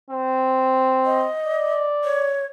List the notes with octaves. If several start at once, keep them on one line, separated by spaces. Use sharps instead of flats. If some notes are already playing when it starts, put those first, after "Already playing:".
C4
D#5
D5
C#5